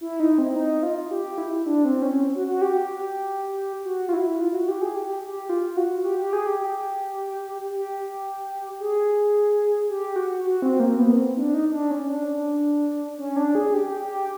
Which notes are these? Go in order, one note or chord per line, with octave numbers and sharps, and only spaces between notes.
E4
D#4
C4
D#4
F4
G4
E4
D4
C4
C#4
F#4
F#4
G4
F#4
F4
E4
F4
F#4
G4
G#4
G4
G4
F4
F#4
G4
G4
G#4
G4
G4
G#4
G4
F#4
F#4
C4
A#3
B3
C4
D#4
D4
D#4
D#4
D4
C#4
D4
C#4
D4
G#4
G4
G4